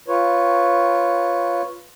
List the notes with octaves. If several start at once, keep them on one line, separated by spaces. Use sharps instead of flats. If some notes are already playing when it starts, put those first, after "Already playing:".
F4 B4 C#5